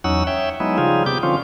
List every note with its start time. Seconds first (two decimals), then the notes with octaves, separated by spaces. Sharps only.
0.04 E2 F#3 C#4 D#4 F#5 E6
0.27 C#5 E5 G5
0.60 F#3 G#3 B3 D#4 E4
0.78 C#3 F3 G3 D#4 F4 G#4
1.06 C3 B3 G4 D6 G6
1.23 D3 F3 C4 C#4 F4